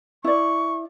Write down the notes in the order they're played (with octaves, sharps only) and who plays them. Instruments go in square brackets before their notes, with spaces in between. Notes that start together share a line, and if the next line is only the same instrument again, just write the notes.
[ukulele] E4 D5 [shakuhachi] C#6